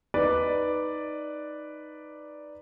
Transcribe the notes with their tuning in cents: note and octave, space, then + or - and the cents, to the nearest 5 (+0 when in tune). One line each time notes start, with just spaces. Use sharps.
D#4 +0 B4 +0 D5 +0